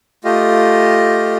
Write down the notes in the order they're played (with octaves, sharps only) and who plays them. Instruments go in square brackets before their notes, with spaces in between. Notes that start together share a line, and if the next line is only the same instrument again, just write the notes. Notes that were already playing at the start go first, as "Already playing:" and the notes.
[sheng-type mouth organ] A3 F4 G4 D#5